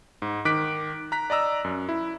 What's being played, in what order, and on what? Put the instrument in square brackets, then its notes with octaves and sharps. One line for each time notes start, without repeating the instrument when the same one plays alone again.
[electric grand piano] G#2
D#3 D6 F#6 B6 D7
A#5 F#6 B6
D5 D#5 A#5 E6
F#2
E4